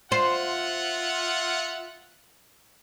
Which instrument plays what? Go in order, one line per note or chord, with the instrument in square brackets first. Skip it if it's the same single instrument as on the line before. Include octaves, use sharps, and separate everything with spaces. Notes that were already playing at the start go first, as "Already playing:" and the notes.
[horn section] F4 E5 F#5 [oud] C5